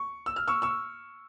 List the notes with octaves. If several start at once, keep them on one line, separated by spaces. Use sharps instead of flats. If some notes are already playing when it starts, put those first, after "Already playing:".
Already playing: C#6
E6
F6
C#6 E6
C#6 E6